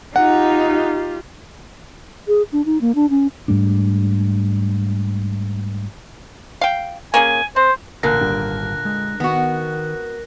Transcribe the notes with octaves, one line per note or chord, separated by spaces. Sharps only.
D#4 F4 G4 F#5
G#4
D4
D#4
A#3
D4
C#4
G#2 G3 A3 D4
F5 G5
A#3 C#4 G#4 G#5
C4 C5
A1 A#2 D3 A#4 F#6 A#6
G#1 G3 D4
G#3
D#3 B3 F#4